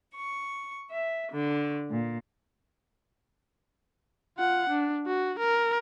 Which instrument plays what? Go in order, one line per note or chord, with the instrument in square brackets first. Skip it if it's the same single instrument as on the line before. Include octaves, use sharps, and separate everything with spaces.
[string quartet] C#6
E5
D3
A#2
[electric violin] F4 F#5
D4
F#4
A#4